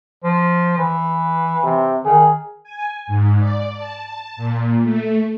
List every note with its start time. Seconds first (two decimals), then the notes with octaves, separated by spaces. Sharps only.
0.23 F3
0.78 E3
1.64 C3
2.05 D#3 G#4
2.63 G#5
3.07 G#2
3.38 D5
3.74 A5
4.36 A#2
4.82 A3